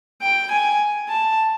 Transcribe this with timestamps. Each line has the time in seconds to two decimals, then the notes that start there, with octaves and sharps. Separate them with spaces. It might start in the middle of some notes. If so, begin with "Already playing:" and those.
0.22 G5
0.51 G#5
1.09 A5